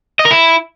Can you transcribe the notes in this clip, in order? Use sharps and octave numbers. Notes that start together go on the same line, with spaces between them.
D#5
A#4
E4